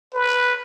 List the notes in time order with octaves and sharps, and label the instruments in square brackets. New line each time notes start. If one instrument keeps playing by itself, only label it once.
[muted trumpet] B4